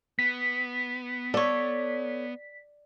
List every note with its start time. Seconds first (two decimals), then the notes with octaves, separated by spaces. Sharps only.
0.19 B3 B6
1.34 A4 C#5 D5